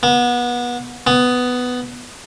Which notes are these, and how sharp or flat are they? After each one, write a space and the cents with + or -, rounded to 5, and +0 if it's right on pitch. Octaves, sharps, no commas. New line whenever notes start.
B3 -25
B3 +10